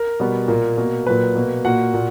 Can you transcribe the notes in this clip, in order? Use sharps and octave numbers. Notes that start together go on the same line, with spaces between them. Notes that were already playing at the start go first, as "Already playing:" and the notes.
Already playing: A#4
B2 G3 B3
A#2 A#3
B2 A#3
A#2 F#3 A#3 B4
B2 A#3
A#2 A#3 F#4 F#5
A#2